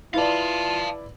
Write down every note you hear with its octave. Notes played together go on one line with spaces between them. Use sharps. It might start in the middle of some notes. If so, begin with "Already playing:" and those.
E4 F4 B4 D5 F5 A5